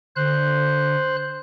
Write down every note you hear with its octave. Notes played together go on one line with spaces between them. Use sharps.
D3 C5 F#6